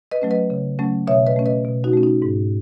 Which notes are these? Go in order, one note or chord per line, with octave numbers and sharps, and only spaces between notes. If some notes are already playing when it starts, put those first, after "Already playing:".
B4 D#5
F#3 A3 C#4
B4 D#5
C#3
F#3 A3 C#4
B2 C#5 E5
B4 D#5
A3 C#4
B4 D#5
B2
D#4 F#4
A3 C#4
D#4
G#2